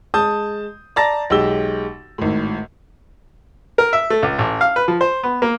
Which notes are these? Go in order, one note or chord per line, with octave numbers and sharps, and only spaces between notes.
G#3 A5 D#6 G6
D5 A5 A#5 A6 A#6
B1 G#3 G4 E6 G7
G#1 A2
A#4
E5
A3
C#2
A1
F5
B4
F3
C5
B3
A#3